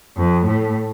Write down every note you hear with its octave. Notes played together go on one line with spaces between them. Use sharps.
F2
A2